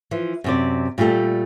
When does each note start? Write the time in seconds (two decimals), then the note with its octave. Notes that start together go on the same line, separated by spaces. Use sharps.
0.11 E3 F3
0.44 F#2 C3 D5
0.98 A#2 G3 A3 G4 A4